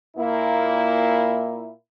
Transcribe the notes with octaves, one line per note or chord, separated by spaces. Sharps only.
A#2 A#3 E4